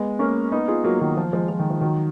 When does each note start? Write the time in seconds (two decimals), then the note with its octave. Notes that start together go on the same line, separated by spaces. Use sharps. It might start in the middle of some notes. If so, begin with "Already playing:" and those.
Already playing: G#3 B3
0.19 A#3 C#4
0.52 B3 D#4
0.68 F4 G#4
0.84 F#3 A#3
1.00 D#3 F#3
1.17 F3
1.33 F3 G#3
1.49 F3
1.59 D#3
1.70 F3
1.81 D#3 F#3